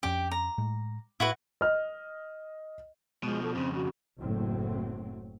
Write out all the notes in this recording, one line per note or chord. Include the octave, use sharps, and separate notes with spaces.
F2 C#4 D4 G4 G5
A#5
A2 G#3
A2 E4 F#4 B4
D#5 F6
B2 F3 G#3
A4
F2 C#3 C4
F#4
F#1 A2 F#3 C4